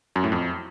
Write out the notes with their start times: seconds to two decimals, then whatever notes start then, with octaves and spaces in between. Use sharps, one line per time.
0.16 F#2
0.24 A2
0.32 F2